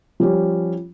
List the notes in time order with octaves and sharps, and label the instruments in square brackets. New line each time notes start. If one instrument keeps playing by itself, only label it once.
[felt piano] F3 G3 C#4